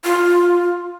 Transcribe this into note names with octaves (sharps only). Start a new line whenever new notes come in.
F4